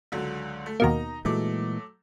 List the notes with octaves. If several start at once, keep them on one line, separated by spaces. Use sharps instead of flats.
C#2 D3 F#3
A3
D#2 B2 A#3 D#4 A#5
A#2 E3 F#3 G#3 A3 D6